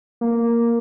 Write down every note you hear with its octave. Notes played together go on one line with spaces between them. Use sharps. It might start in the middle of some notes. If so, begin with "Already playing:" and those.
A#3